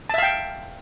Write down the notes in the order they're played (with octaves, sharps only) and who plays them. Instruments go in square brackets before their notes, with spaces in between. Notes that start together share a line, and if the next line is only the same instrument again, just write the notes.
[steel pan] A5
E5
F5
G5